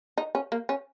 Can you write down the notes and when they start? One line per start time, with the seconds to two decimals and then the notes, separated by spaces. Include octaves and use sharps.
0.18 D#4
0.35 C#4
0.52 A#3
0.69 C#4